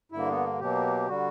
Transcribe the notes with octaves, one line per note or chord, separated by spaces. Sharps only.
G2 D3 A#3 E4
B3
B2 F#3 A#3 G4
D3 G3 F#4